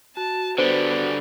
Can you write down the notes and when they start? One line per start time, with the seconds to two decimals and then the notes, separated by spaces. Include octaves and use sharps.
0.17 F#4 A5
0.58 D3 G3 B3 C5